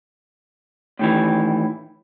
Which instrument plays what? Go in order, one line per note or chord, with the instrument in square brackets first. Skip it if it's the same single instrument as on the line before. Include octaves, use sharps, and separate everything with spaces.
[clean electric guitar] A2 D#3 E3